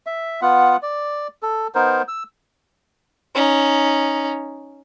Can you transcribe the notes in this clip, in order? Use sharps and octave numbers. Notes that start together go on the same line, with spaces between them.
E5
B3 F4 F#5
D5
A4
B3 D#4 A#4 C5
E6
C#4 D#4